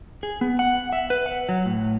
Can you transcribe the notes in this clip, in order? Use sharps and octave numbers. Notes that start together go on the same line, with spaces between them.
G#4
B3
F#5
E5
B4
F#5
F#3
A2